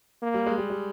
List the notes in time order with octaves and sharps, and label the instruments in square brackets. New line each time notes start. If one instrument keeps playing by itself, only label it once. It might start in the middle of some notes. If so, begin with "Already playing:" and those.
[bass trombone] A#3
[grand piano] G3
G#3
G3
G3